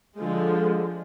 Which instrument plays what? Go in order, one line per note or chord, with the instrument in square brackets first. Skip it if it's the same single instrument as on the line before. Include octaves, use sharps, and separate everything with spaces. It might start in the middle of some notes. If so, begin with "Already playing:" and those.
[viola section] D3 F3 G#3